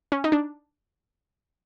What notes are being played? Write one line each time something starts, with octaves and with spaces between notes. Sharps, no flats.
C#4
D#4
D4